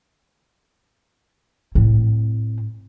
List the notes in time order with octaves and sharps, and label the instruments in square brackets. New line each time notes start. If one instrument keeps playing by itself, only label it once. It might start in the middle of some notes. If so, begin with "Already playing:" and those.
[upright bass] A2 C4